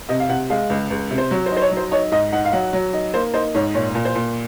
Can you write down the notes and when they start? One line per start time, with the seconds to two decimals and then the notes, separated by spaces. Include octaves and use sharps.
0.09 C3 D#5
0.20 F5
0.29 C3 F#5
0.50 G#3 F5
0.70 C#2
0.90 C#2
1.11 C3
1.18 C5
1.31 F#3 C#5
1.46 C5
1.51 D#4
1.57 C5
1.62 C#5
1.71 F#3
1.77 C5
1.91 D#4 C#5
2.12 G#2 D#5
2.32 D#4 F#5
2.45 F5
2.52 F#3 F#5
2.73 F#3
2.93 D#4
3.14 A#3 C5
3.34 D#4 C5
3.54 G#2 C#5
3.74 A#2 C#5
3.95 A#2
4.05 C5
4.15 A#2